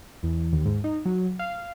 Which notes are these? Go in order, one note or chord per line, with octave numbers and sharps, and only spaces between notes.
E2
D#2
G#2
D#4
F#3
F5